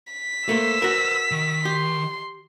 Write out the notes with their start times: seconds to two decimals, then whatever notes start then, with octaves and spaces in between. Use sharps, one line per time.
0.13 B6
0.49 A3 A#3 B4 C5 E6
0.82 F#4 A#4
1.31 D#3
1.65 G4 C6